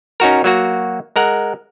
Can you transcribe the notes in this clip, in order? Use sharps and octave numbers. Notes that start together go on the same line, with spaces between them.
C#4 D#4 F#4 A#4
F#3 A#3 F#4
G#3 A#4 F#5